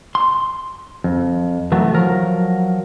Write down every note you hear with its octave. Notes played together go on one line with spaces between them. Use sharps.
C6
F2
E3 F#3 A3 B3
F3 F#3 A#4